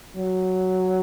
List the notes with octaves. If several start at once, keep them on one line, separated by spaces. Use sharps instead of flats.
F#3